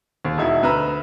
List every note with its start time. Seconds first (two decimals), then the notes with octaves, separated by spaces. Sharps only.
0.25 D#2
0.38 E1 D#4 E4 F#4
0.63 D2 B4 A#5 E6